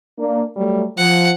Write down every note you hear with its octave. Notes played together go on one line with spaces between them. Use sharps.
A#3 D4
F#3 G3 A3
F3 F#5